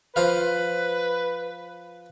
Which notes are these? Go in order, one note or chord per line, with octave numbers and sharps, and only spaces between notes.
F3 B4 C5 F5